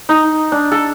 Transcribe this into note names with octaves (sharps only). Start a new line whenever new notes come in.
D#4
D4
A4